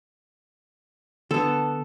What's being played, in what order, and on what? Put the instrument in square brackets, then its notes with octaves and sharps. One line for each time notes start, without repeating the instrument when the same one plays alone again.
[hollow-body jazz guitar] D3 B3 [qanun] A4